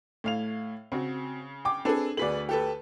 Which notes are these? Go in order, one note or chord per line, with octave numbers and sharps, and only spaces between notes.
A2 F5 F7
C#3 C4 F#4
G5 D6
C4 D4 G#4 A4 B4
D2 G#4 B4 D5 B6 F#7
G4 A4 B4